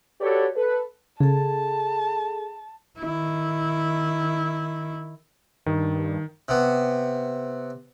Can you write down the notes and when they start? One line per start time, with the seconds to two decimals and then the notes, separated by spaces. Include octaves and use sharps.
0.21 F#4 G4 A4 B4 C#5 D5
0.56 A4 B4
1.20 C#3 G#4 A4 A5
2.99 D#3 E4
5.66 G2 D#3
6.48 C3 B3